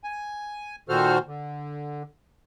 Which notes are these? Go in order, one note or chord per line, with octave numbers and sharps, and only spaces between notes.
G#5
A#2 D#3 F#4 A4 C5 F6
D3